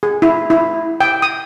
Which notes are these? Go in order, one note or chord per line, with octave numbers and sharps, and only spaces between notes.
G#4
E4
E4
G5
D#6